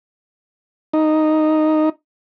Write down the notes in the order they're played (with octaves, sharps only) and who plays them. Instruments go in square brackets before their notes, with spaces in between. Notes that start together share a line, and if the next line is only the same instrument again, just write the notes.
[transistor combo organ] D#4